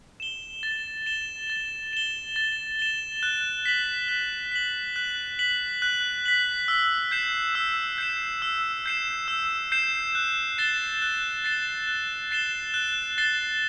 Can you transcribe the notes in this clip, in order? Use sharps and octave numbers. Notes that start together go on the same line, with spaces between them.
E7 G7
A6
E7 G7
A6
E7 G7
A6
E7 G7
F#6
B6 F#7
F#6
B6 F#7
F#6
B6 F#7
F#6
B6 F#7
E6
G6 C7 E7
E6
G6 C7 E7
E6
G6 C7 E7
E6
G6 C7 E7
F#6
A6 C7 E7 G7
F#6
A6 C7 E7 G7
F#6
A6 C7 E7 G7
F#6
A6 C7 E7 G7